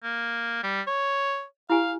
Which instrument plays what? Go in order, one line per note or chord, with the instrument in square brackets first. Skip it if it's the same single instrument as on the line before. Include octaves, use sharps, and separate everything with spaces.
[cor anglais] A#3
G3
C#5
[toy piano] E4 G4 G#5 [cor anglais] F5